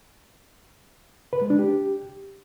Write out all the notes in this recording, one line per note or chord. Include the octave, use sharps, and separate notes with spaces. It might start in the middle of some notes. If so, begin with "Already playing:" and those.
B4
G#3
D4
G4